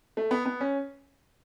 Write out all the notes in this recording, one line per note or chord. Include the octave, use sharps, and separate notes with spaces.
A3
B3
B3
C#4